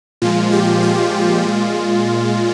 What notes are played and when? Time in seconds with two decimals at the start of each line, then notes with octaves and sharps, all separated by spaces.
0.22 A#2 F3 G#3 F4
0.52 G4
0.82 F4
1.43 A#2 G#3